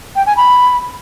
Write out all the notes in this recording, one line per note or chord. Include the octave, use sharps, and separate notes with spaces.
G5
G#5
B5